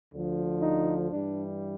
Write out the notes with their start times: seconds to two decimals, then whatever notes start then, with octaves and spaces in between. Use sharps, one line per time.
0.12 D2 D3 F3
0.62 D#4
1.11 G2 E3 G3 D4